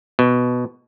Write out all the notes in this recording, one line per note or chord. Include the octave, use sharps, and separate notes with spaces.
B2